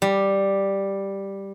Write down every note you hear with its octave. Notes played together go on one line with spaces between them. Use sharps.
G3